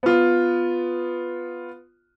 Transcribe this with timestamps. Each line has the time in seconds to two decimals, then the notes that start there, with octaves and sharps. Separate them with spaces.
0.03 B3 F4